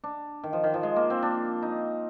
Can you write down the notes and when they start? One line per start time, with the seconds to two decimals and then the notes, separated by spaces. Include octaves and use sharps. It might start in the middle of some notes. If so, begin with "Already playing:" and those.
0.04 D4
0.44 D#3
0.53 F3
0.64 D#3
0.74 F3
0.83 G#3
0.96 A#3
1.10 C4
1.22 D4
1.62 D#4